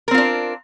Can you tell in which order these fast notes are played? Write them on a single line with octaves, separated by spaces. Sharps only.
A#4 C4 F4 D4